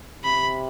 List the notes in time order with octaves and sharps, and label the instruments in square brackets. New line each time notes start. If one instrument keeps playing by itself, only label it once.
[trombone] C3 [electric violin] B5